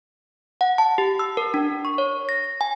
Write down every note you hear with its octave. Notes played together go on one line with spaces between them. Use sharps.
F#5
A5
G4
E6
A#4
D4
C#6
C#5
A#6
G#5